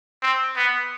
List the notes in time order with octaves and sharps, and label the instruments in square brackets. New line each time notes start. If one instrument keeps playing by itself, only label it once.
[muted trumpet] C4
B3